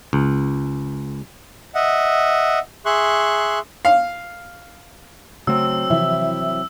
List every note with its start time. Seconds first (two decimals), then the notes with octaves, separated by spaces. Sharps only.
0.13 C#2
1.75 D#5 E5 F#5
2.85 G#4 E5 C6 C#6 F#6
3.85 F5
5.47 C#3 F#3 A3 C4 E6
5.90 C3 E3 F3 E4